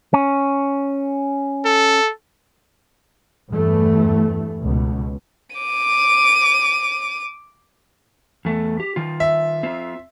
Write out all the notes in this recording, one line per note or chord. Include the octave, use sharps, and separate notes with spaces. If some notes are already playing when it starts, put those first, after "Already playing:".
C#4
A4
E2 G2 E3 A3
C#2 B2
D6 D#7
E2 A3
G4
D#3 F4
E5
C4 F4